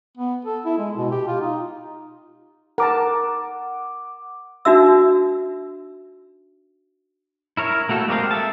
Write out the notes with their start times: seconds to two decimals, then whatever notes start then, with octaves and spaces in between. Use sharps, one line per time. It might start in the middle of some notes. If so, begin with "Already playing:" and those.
0.17 B3
0.45 A4
0.65 E4
0.78 G#3
0.97 B2
1.11 G4
1.27 F4
1.41 D#4
2.78 A#4 F#5 A5 D6
4.65 D4 D#4 F#4 E5 E6
7.57 E4 A#4 C#5
7.89 A3 A#3 F#4 A4
8.08 G#3 C4 G4 A#4 F5
8.31 A4 E5 A5